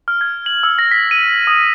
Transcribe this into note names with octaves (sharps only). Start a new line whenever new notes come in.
F6
G#6
F#7
E6
A#6
B6
D#7
D#6